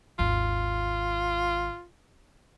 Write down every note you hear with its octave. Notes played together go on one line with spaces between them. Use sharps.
G#1 D#2 F4